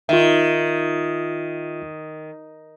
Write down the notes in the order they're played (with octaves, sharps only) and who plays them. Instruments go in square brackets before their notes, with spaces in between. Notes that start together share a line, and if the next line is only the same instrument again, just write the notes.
[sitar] D#3 [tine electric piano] F4 E5